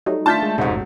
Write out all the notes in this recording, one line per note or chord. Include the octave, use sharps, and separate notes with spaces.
F#3 G3 A3 D#4
D#3 A3 D4 F4 A5 G6 B6
G#3
D#1 G#2 C3 G#3 A3 F#4
G1